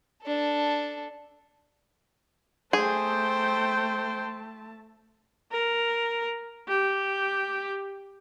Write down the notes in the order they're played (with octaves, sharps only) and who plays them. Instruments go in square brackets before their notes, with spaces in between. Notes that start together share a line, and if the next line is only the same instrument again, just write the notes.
[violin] D4 A4
[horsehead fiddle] A3 A5 [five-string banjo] G#4 [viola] C5 G5
[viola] A#4
G4